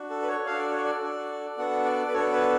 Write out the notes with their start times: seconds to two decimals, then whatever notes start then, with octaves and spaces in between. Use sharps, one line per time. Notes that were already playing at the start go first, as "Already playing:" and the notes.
Already playing: D4 F#4
0.10 A4
0.22 B4
0.28 C#5
0.46 D4 F#4 A4 F5
0.59 D5
0.71 C#5
0.84 D5
1.02 D4 F#4 A4
1.58 B3 D4 F#4 A4 F#5
1.85 D5
2.08 B4
2.13 B3 D4 F#4 A4 C#5
2.32 B4